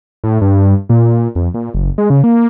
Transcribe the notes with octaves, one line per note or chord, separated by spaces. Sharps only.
A2
G2
A#2
F2
A#2
F#1
G#3
C#3
A#3